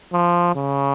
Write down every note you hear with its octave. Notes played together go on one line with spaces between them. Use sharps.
F3
C#3